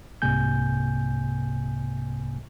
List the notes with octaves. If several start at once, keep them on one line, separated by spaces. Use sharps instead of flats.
C2 G#2 C3 A#3 G#5 G6